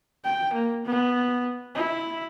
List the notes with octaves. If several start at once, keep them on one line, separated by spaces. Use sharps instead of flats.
G5
A#3
B3
E4